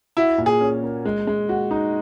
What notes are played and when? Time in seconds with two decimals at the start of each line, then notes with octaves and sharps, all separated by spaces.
0.17 E4 F#4
0.38 A#2
0.46 G#4
0.61 C#4
0.83 A#3
1.05 G#3
1.27 G#3
1.49 F#4
1.71 D#4